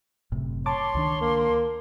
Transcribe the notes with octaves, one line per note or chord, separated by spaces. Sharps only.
F#1 A2 C3
C#5 A5 C6 D6
C#2 D#3 D4
A#3